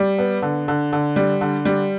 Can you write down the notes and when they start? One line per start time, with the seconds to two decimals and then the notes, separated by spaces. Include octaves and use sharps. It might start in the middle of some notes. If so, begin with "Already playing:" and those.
Already playing: G3
0.19 B3
0.42 D3
0.68 D3
0.93 D3
1.16 G3
1.41 D3
1.65 G3